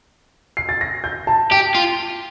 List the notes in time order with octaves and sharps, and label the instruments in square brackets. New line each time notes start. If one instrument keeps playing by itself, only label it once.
[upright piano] C7
A6
A#6
G6
A5
[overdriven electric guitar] G4 [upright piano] G5
[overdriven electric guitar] F4